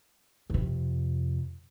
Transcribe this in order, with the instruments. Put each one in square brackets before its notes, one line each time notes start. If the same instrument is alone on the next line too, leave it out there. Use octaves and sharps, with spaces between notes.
[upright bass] F2 C3